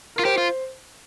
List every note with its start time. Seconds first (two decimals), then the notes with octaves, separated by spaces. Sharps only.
0.16 F4 A#4
0.25 G4 C5
0.38 F4